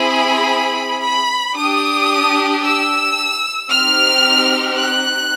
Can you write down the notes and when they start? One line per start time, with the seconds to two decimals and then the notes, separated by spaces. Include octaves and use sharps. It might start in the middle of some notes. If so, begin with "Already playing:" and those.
Already playing: C4 E4 G#4 B5
1.03 B5
1.56 D4 G4 D#6
2.62 E6
3.69 C4 D#4 G4 F6
4.77 F#6